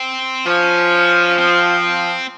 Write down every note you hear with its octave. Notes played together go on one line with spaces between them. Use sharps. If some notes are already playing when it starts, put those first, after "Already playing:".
Already playing: C4
F3 C#4
C4